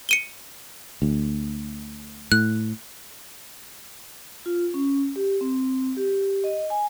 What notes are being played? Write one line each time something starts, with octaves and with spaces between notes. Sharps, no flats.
C#7 D#7 G7
D2
A2 F#6
F4
C#4
G4
C4
G4
D#5
G#5